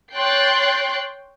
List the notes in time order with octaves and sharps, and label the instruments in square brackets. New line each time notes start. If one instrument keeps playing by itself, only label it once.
[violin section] C#5 G5 C6 F#6 A6 C7